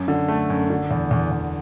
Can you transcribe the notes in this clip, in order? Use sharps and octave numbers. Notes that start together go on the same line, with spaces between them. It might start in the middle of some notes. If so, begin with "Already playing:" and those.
Already playing: F#2
D3
A3
F#2
D3
E2
E2
E2